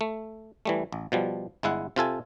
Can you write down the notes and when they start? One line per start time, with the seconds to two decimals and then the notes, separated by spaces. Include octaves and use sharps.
0.01 A3
0.65 E3 G3 A3
0.92 A1
1.12 B2 F3 G3
1.63 G1 G#3 E4 F#5
1.96 C3 F4 A4 G#5